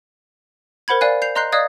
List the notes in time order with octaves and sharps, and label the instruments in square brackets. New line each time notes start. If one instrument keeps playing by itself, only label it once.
[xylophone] A#4 C5 F#5 B5 G#6
D5 F5 G#5 F#6
G6 C7 F7
D#5 A#5 C6 F#6 G6 C7
D5 D#5 F5 D#6 F#6 G#6